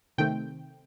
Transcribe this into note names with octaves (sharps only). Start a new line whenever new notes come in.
C3 D#3 A3 C4 G5